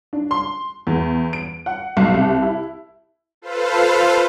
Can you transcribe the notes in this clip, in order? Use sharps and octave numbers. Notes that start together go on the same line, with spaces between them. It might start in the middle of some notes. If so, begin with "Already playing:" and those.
D4
C6
E2
D7
F#5
B1
C2
E4
F4 A4 B4 C5 F5